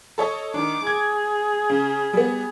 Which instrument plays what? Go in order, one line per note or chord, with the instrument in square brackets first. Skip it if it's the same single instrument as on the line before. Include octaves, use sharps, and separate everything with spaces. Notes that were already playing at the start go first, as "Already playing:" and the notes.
[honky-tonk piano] A4 C#5 D#5
[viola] D#3 D6 [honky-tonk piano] D4
[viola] G#4 [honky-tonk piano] G#6
[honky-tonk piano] C#3
G3 B3